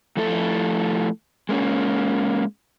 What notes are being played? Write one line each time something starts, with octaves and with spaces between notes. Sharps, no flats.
F3 A3 E4 A4
G#3 A#3 C#4